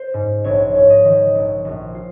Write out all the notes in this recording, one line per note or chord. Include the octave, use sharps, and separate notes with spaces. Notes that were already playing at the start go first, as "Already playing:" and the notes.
Already playing: C5
G#2
A#1 C#5
G#2 C#5
D#5
D#3
A#1
A#1 F#4
F4